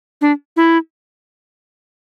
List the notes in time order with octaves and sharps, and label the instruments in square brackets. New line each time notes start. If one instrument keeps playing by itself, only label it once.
[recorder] D4
E4